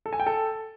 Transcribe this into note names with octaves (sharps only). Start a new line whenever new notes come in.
A4
G#5
G5
A4